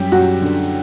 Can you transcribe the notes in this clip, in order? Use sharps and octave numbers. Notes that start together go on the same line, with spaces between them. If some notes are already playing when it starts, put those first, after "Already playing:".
Already playing: F#2 G3 G4
F#2 F#4
D3